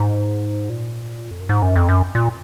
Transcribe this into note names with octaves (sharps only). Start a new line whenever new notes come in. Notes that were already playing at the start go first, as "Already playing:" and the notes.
Already playing: G#2
A#2
F2
F#2
G#2
F#2
F2
F#2
A#2